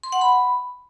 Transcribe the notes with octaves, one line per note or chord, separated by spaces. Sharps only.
C6
F#5
B5